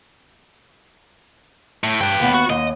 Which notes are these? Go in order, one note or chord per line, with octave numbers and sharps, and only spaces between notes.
A2
G2 B4 G5
D#2 B3
F#4
D#2 D#5